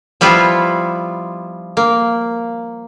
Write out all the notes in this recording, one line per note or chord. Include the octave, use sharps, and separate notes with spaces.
F3 G3 B3 E4 F4
A#3